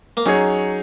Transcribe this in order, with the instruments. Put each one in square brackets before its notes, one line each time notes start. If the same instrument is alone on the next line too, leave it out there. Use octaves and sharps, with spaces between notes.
[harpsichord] A#3
[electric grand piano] F#3 D#4 G#4 C#5 [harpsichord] C#4